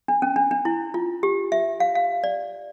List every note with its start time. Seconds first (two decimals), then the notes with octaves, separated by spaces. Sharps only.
0.08 D4
0.22 C#4
0.36 D4
0.51 D4
0.65 E4
0.94 F4
1.23 G4
1.52 E5
1.80 F5
1.95 F5
2.24 D5